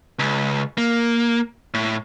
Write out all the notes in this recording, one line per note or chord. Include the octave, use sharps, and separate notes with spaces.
C#2
A#3
A2